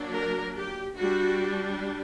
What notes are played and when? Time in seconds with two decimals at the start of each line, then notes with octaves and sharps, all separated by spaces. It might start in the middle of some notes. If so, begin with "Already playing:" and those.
Already playing: F#3 A#3 D4
0.16 A#4
0.57 G4
0.97 G3 D4 F#4